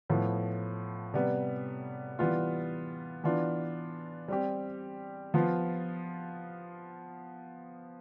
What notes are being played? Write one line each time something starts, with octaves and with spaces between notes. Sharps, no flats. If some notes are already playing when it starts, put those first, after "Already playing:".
A2 F3 B3
C3 G3 B3
E3 G3 B3 F4
E3 B3 D4 F4
G3 C4 G4
F3 B3 F4